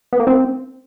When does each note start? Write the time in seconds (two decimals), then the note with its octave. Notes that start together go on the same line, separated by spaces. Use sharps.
0.13 B3
0.20 A#3
0.27 C4